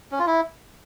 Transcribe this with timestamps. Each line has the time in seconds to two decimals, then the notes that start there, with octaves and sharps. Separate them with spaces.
0.12 C#4
0.19 F4
0.27 E4